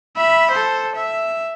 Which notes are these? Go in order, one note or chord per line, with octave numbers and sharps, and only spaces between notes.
E5 B5
A4 C5
E5